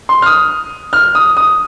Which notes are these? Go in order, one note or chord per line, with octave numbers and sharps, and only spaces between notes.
C6
F6
D#6
F6
D#6
D#6